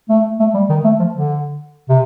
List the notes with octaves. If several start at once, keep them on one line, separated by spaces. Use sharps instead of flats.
A3
A3
G3
D#3
A3
F3
D3
C3